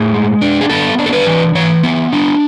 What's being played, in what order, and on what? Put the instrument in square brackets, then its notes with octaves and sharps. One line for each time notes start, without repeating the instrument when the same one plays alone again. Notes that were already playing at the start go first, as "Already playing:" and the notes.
Already playing: [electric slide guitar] A2 G#4
G#3
D4
G#4
B3 A4
D4
A4
B4
E3
E3 C#5
B3
D4